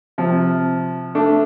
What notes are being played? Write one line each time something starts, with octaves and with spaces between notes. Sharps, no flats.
C3 F3
A3 D4